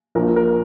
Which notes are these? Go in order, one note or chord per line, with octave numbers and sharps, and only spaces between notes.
A#1 A#2 A#4
A#4